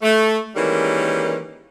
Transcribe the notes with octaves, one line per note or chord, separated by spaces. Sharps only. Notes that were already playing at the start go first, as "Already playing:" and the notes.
A3
D#3 E3 G3 G#3 A#3 C#4